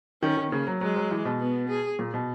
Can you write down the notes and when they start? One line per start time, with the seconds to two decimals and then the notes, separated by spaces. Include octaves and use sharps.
0.23 D#3 C#4
0.37 D#3
0.51 C#3 A#3
0.67 F#3
0.81 F#3 G#3
0.96 F#3
1.11 E3
1.25 B2
1.40 B3
1.69 G#4
1.99 A#2
2.14 B2